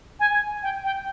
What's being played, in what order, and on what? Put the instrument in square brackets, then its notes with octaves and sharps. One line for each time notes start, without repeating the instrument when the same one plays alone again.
[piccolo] G#5
G5
G5